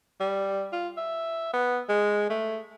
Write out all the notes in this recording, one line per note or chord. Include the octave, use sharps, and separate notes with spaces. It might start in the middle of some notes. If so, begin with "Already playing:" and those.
G3
F4
E5
B3
G#3
A3